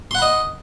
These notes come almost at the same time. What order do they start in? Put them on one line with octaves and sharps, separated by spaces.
C6 F#5 B5 D#5